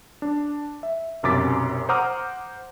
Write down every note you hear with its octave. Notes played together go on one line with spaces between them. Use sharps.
D4
E5
B1 F#2 C3 D6 A6 B6
C5 F#5 A#5 D6 D#6 F6